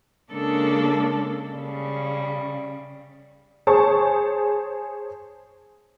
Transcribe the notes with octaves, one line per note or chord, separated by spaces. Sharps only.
C#3 G#3 A#3 D4 A4
C#3 G3
G#4 C5 C#5 A5 C#6